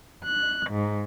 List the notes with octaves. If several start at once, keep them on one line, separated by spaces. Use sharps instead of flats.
F#6
G#2